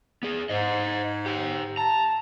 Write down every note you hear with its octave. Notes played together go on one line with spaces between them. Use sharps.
B3 G#4
G#2 C5 D#5
G4 A#5
A5 A#5